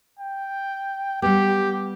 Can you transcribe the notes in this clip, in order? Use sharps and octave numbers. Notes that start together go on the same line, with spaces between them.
G5
G3 B3 G4